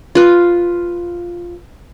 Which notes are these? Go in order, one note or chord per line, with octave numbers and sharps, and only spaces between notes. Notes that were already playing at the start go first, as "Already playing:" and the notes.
F4 B4